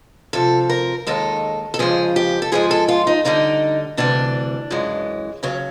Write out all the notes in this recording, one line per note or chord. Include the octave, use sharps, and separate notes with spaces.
D2 C3 F3 A4
A#4
D#2 D#3 G#3 A4
A4
F2 C#3 F3 G#3 G#4
G4
A4
G#2 F3 G#3 G#4
A4
F4
D#4
D2 D3 G3 D#4
D2 C3 E3 G3 D4
F#2 C#3 E3 G#3
D#2 C#3 F#3 C#4